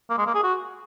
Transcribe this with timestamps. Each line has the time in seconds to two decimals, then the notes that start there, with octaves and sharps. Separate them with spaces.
0.10 A#3
0.18 G#3
0.27 A#3
0.35 G#4
0.43 F#4